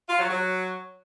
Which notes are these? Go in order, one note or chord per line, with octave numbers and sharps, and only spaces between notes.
F4
F#3
F#3